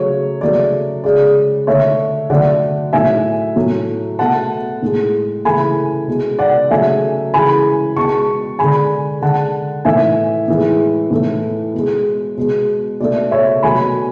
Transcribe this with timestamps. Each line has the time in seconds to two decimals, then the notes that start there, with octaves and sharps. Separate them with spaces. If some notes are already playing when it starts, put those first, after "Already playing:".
Already playing: C#3 F#3 A3 C#5
0.41 C#3 F#3 A3 D5
1.04 C#3 G#3 D5
1.67 D3 A3 C#5 E5
2.30 D3 F#3 A3 D5 F#5
2.93 A2 F#3 A3 E5 G#5
3.56 A2 F#3 A3
4.19 B2 A3 F#5 A5
4.82 A2 G#3
5.45 C#3 E3 A3 G#5 B5
6.08 B2 G#3
6.39 D5 F#5
6.71 C#3 F#3 A3 E5 G#5
7.34 C#3 E3 G#3 G#5 B5
7.96 B2 G#3 A5 C#6
8.59 D3 G#3 G#5 B5
9.22 D3 G#3 F#5 A5
9.85 A2 E3 A3 E5 G#5
10.48 A2 E3 G#3
11.11 A2 E3 A3
11.74 B2
11.79 G#3
12.37 B2 G#3
13.00 B2 A3 D5
13.31 C#5 E5
13.63 B2 F#3 A3 G#5 B5